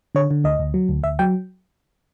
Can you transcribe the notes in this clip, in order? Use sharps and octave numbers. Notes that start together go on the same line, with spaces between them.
D3 C#5
D3
D2 D#5
D2
F#3
D2
D2 E5
F#3 G5